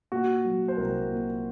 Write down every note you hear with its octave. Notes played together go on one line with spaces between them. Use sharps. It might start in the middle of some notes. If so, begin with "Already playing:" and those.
A#2 F#4
F#3
C5
C2 A#4
A#2